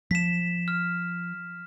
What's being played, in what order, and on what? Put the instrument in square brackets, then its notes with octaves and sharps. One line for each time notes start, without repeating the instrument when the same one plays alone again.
[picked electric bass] F3 [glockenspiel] B6 E7
[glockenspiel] F6